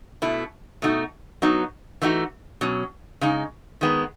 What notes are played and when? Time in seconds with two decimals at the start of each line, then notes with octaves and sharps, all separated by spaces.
0.22 B2 A3 E4
0.82 B2 A3 D#4 F#4
1.42 F#3 B3 D#4 F#4
2.02 E3 A3 D#4 F#4
2.61 B2 F#3 C#4
3.21 C#3 G#3 D#4
3.81 D#3 G#3 B3